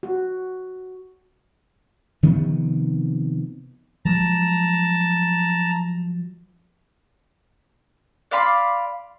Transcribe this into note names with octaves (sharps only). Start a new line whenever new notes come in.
F#4
C3 D#3 F3 B3
F3 F#3 G#3 A5 A#5
D5 F5 B5 C6